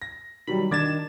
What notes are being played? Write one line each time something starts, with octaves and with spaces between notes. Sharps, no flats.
A#6
D#3 F#3 G3 B5
D#3 D4 D6 G#6 A6 E7